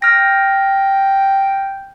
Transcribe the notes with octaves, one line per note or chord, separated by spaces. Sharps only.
G5 F6 A#6